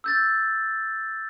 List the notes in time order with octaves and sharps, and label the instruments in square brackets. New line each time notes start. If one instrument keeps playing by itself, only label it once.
[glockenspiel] E6 G6 A6